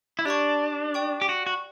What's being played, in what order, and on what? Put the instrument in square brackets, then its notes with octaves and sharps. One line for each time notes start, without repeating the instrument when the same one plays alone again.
[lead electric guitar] E4
[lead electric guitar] D4 [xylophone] G4 D5 A5 C#6
[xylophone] D5 G5 C#6
[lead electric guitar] G4
F#4
F#4